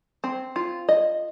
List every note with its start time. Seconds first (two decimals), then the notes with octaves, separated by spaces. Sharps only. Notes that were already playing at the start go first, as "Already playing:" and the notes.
0.24 C4
0.56 F4
0.89 D#5